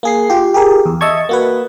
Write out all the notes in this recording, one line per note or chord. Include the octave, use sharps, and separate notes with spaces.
A#3 G#4 C7
F4 G4
G4 G#4 A#4
E2
D#5 E5 A5 C#6 G#6
A#3 F#4 B4